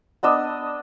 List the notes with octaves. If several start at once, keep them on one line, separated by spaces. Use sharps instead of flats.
B3 D4 D#5 E6